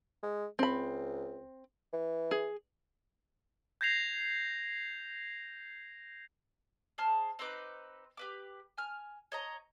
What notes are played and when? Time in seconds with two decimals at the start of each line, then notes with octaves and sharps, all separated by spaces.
0.23 G#3
0.59 C#2 C4 B5
1.93 E3
2.31 G#4
3.81 G6 G#6 A#6 C7 F7
6.98 G#4 C5 A5 F6
7.39 C4 D#4 B4 D6
8.17 G4 B4 D6
8.78 G#5 F6
9.32 C#5 D#5 A#5